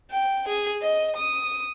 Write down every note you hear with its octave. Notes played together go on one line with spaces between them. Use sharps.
G5
G#4
D#5
D#6